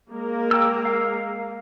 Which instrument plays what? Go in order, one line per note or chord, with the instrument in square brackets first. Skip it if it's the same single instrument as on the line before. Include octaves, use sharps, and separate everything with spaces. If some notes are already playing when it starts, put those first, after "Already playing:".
[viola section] G#3 A#3 A#4
[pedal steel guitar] G5 E6
F5